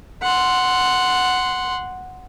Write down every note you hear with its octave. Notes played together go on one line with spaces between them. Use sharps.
F#5 C6